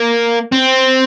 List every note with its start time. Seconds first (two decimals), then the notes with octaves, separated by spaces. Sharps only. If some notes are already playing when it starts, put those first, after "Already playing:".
Already playing: A#3
0.52 C4